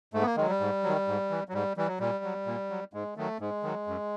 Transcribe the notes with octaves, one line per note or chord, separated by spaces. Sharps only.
G#2 A3
B3
A#3
D#3 F#3 G#3
G3
G#2
D#3 F#3
G#2
E3
F#3
G#2 G3
E3 G3
F#3
A#2 G3
F#3
A#2
F#3
G#2 G#3
D#3 F#3 A3
G#2 G#3
D#3 F#3
F#2